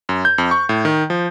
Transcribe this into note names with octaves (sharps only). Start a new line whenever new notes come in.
F#2
G6
F2
C#6
A2
D#3
F3